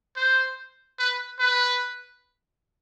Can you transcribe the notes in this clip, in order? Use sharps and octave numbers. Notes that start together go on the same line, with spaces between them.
C5
B4
B4